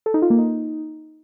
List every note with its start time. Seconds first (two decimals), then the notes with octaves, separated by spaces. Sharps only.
0.06 A4
0.14 D#4
0.22 F4
0.30 A#3
0.38 D#4